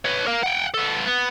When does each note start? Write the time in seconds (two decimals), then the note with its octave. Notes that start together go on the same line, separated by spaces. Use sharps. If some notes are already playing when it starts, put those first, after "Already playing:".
0.05 B4 C#5
0.27 A#4 F5
0.43 F#5 G5
0.74 B3 A4
1.06 B3